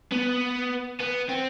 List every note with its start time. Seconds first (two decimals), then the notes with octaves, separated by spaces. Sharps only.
0.12 B3
1.00 B3
1.28 C4